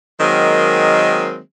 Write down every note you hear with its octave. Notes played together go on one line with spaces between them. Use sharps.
D#3 F#3 G#3 A#3 C4